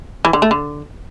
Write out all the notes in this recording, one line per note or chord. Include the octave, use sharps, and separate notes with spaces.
E3
D3
A3
D3